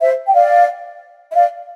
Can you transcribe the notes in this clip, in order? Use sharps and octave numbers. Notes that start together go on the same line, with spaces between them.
C5 E5
G5
D5 F5
E5
D5 F5